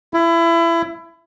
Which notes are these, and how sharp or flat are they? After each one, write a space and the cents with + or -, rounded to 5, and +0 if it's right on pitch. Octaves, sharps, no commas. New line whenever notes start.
E4 +25